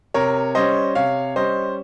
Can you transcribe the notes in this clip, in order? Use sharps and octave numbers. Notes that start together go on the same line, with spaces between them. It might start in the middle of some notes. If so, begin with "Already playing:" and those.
C3 A#4 C#5
G3 C#4 C5 D#5
C3 C#5 F5
G3 C#4 C5 D#5